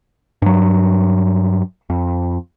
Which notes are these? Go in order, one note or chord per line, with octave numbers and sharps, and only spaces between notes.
G2 F#3
F2